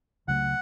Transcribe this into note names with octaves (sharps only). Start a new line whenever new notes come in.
C#2 C#3 F#3 A3 F#5